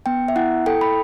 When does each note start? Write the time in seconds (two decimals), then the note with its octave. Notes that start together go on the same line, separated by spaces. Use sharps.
0.06 B3 G5
0.28 E5
0.36 E4 F#5
0.66 A4 G5
0.81 B5